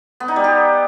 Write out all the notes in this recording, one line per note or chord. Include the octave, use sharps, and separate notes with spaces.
B3
D#4
G3
G4